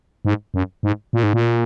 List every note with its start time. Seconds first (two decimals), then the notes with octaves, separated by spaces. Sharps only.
0.25 G#2
0.54 F#2
0.83 G#2
1.13 A#2
1.23 G#2
1.33 A#2